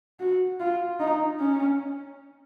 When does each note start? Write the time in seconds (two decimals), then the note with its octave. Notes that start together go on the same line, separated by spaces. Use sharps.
0.20 F#4
0.60 F4
1.00 D#4
1.39 C#4